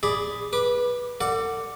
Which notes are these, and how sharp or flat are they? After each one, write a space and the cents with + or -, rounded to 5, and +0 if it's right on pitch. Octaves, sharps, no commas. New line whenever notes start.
G#4 +0 D5 +0 B5 +0
B4 -15 D6 +25
A4 +45 D5 -5 F#5 -5